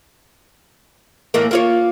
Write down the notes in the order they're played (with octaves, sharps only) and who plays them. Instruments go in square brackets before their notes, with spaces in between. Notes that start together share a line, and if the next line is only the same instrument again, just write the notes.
[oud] A2 E3 A#3
A#3 F4 C#5